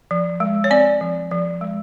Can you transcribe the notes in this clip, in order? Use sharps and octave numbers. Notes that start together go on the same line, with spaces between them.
F3
G#3
C#5
C4 D5
F3
F3
G#3